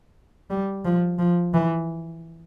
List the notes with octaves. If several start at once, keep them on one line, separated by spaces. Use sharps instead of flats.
G3
F3
F3
E3